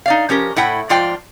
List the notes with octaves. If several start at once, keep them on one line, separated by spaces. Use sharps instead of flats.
D#4 D5 F5
F3 C#4 G4 A#4
A2 E4 F#5 G5
G#2 F3 F4 D5 G5